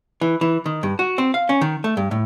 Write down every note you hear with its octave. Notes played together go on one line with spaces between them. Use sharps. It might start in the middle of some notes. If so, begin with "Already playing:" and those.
E3
E3
D#3
G2
F#4
C4
F5
C#4
D#3
A3
G2
A2